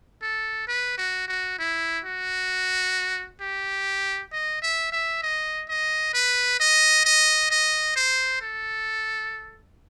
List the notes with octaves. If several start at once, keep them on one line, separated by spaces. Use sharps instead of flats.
A4
B4
F#4
F#4
E4
F#4
G4
D#5
E5
E5
D#5
D#5
B4
D#5
D#5
D#5
C5
A4